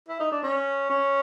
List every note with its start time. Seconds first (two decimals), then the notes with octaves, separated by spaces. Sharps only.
0.08 E4
0.20 D#4
0.32 D4
0.44 C#4
0.90 C#4